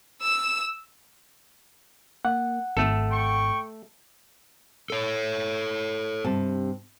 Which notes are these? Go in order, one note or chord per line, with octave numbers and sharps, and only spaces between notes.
E6 E7
A#3 F#5
G#1 A3 A4
G5 C#6
A4 C#5
G2 C3 A5